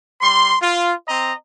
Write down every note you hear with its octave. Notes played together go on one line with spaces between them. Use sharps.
G3 C6
F4
C4 D#5 A#5